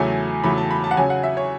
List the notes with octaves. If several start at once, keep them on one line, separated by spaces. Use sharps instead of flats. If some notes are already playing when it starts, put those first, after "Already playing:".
Already playing: E2 C#3 F#3 A3 G#5
E2 C#3 F#3 A3 B5
A5
B5
A5
F#5
C#3 F#3 C#4 G#5
F#5
E5
C#5